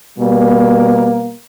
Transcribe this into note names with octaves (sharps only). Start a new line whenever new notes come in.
B2 G3 A#3